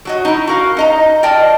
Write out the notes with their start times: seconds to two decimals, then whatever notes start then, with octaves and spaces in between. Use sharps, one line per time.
0.05 F#3 F#4 D#5
0.25 D#4 E4
0.47 F#4 A#4 F5
0.77 D#4 D#5 A#5
1.23 A#4 D5 D#5 G5 A5